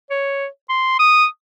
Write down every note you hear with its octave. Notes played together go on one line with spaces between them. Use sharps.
C#5
C6
D#6